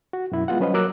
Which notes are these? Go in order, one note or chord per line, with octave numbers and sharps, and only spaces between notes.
F#4
F#2 B2 E4
G#3 B3 F4 F#5
F#3 G3 C#4 B4 C5 D#5
F#3 A#3 A#4 D6 E6 F#6